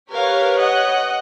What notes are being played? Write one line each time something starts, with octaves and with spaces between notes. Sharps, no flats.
G4 A#4 B4 C#5 F5
D#5 F#5